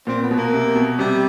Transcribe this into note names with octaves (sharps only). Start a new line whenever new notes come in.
A#2 C4
B3
B2
A#3
C3
B2
C3 G3